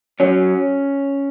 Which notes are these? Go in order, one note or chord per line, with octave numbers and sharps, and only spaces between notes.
F#3 C#4